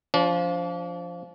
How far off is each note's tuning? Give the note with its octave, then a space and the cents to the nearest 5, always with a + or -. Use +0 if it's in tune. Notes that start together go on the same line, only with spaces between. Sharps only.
F3 +0 D4 -40